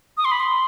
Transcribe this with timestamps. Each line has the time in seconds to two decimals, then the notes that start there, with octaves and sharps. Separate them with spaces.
0.17 D#6
0.25 C6
0.31 B5
0.40 C6